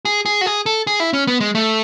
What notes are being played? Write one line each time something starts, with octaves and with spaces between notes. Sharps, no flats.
G#4
G#4
F#4
G#4
A4
G#4
E4
C#4
B3
G#3
A3